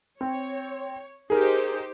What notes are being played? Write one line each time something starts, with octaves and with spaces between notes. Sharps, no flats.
C4 C#5
D#4 G4 G#4 A#4 C5